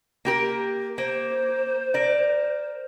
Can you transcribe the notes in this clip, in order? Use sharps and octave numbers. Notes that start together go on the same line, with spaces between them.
A#3 G4 A#4
A#3 C5
A#4 D5